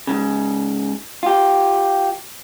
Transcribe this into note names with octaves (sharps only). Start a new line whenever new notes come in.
G#2 C#3
F4 G4